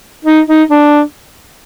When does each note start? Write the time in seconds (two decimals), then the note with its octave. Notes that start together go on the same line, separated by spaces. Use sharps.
0.25 D#4
0.47 D#4
0.70 D4